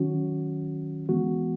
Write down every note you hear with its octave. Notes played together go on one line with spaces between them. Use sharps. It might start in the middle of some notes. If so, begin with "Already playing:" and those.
Already playing: D#3 F#3 C#4 F#4
E3 G#3 B3 F#4